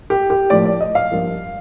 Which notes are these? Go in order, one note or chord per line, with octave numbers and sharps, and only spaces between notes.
G4
G4
A2 F3 A#3 D5
D5
D#5
F5
G2 F3 A#3